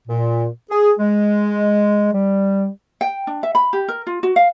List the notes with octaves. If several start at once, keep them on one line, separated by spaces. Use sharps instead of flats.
A#2
G#4
G#3
G3
G5
D4
E5
B5
G4
A#4
F4
F#4
F5